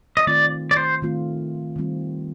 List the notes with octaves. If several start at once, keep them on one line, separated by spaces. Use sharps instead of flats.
D#5
D#3 A3 C4 F4 D5
D5
C5
D#3 A3 C4 F4
D#3 G3 C4 F4